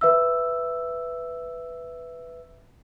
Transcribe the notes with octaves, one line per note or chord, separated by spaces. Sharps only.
B4 E5 E6